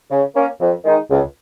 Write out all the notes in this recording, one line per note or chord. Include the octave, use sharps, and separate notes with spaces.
C#3
A#3 C#4
F2
D#3 G#3 D#4
C#2